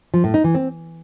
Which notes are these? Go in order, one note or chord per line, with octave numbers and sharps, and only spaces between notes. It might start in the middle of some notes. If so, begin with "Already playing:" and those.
F3
A2
D#4
E3
C4